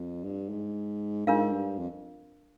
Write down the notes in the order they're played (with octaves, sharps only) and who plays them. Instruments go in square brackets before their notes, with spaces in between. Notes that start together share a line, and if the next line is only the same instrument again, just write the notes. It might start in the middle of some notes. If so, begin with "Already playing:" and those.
Already playing: [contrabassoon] F2
G2
G#2
[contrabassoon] G#2 [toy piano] D4 F4 A#4 F5
[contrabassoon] G2
F2